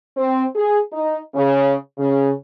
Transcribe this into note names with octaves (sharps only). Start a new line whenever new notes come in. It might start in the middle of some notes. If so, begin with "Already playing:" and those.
C4
G#4
D#4
C#3
C#3